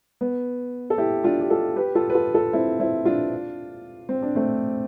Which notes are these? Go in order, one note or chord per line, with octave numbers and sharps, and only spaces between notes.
B3
A4
E4 G4
D4 F4
G4
F4 A4
G4 B4
F4 A4
B4
F4 A4
F4 A4
C4 E4
C4 E4
D4 F4
C4
D4
A3 C4